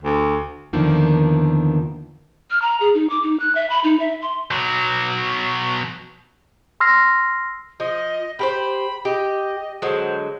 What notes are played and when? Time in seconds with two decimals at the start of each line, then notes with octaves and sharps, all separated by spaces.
0.02 D2
0.73 E2 D3 D#3 F3 A#3
2.51 F6
2.62 A#5
2.81 G#4
2.94 D#4
3.10 D6
3.23 D#4
3.40 F#6
3.55 E5
3.70 B5
3.84 D#4
4.00 E5
4.22 C6
4.51 B2 F#3
6.80 C6 E6 F6 A#6 C7
7.80 F3 D#5
8.39 G4 A#4 C5 B5
9.05 G4 D#5
9.82 D3 F#3 G#3 C5